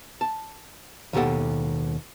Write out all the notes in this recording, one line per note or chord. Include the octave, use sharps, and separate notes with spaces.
A5
D#2 B2 G4 A4 F#5